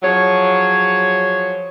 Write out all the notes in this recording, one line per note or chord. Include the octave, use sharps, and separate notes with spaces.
F3 F#3 G#4 C#5